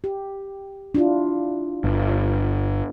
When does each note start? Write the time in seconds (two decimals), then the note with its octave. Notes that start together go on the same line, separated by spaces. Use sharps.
0.04 G4
0.95 D4 E4 F4
1.84 G1